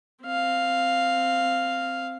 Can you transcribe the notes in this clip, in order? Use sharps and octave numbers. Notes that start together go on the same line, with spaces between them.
C4 F5